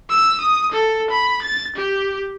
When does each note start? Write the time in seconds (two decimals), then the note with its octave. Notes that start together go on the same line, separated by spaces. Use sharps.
0.10 E6
0.41 D#6
0.72 A4
1.11 B5
1.42 A6
1.76 G4